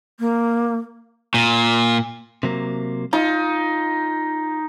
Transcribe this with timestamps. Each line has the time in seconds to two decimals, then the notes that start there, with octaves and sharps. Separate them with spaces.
0.19 A#3
1.34 A#2
2.43 C3 F#3 A#3
3.13 D#4 F4